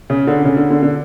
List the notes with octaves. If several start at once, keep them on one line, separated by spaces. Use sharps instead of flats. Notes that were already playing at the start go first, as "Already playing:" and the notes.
C#3
D3
C#3
D3
D3
D3